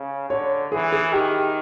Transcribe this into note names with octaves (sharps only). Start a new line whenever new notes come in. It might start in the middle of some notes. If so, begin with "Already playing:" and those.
Already playing: C#3
D3 C#5
E3 G#4
G#4
D#3 G4